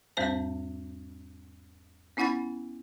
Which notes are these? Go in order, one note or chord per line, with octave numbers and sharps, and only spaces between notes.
E2 G#2 G3 C4 C5 A5
B3 C#4 E4 F#5 B5 A6